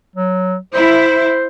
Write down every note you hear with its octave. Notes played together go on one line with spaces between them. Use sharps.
F#3
E4 C5